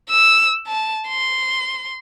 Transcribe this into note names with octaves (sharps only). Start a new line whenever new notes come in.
E6
A5
C6